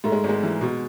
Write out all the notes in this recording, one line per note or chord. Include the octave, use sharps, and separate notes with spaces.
G#2 A3
G#3
G#1
G#3
E3
B2